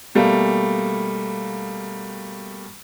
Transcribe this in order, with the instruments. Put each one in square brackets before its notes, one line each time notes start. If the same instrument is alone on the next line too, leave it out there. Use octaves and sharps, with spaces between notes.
[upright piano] B2 G3 A3 A#3